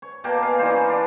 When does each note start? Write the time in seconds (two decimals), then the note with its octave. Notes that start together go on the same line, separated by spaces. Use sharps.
0.02 C#5
0.24 B2 A#3 G5 A5
0.42 F5 G#5
0.59 E3 D#4 C5 D5
0.70 C#4
0.89 D4 A5